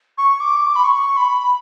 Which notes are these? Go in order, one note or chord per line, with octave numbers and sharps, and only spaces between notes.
C#6
D6
C#6
D6
B5
C#6
B5